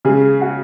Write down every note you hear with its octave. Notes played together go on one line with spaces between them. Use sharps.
C#3 G#3 G#4
F#4